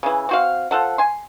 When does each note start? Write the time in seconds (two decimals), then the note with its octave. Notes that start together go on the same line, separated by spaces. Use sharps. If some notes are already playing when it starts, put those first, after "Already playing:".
0.03 C#3 E3
0.29 C4 F#4 F5
0.71 F3 A4 F#5
0.98 G#5 C6